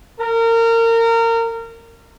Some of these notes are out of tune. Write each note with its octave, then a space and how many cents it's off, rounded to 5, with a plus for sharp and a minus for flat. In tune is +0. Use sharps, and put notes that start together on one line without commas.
A#4 -25